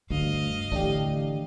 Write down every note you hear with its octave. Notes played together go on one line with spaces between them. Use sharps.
D2 G2 D3 D#5 F5
A2 D3 E3 D4 G4